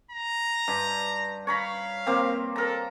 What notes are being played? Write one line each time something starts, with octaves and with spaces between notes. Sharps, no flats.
A#5
G2
C#5 F5 A#5 B5
A#3 C4
A4 A#4 A#5